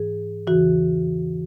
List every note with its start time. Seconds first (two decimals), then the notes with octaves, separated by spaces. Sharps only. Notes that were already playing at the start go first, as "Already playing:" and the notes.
Already playing: G#2 E3 G#4
0.47 E2 C#3 E3 F#4